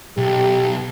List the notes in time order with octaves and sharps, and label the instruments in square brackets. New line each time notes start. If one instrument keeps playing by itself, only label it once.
[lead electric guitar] B1 [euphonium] G4